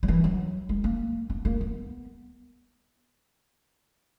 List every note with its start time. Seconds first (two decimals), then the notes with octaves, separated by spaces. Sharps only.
0.03 F#3
0.08 E3
0.24 F#3
0.69 G#3
0.84 A#3
1.30 B3
1.45 A#3
1.61 B3